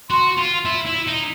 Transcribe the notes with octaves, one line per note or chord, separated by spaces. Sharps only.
F#4 C6
F4
E4
E4
D#4